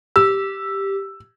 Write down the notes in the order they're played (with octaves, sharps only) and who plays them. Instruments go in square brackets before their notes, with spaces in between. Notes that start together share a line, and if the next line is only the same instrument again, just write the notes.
[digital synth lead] G4 [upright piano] E6